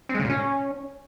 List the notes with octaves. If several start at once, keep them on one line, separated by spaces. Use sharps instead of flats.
C4
G#3
C#3
A#2
C#4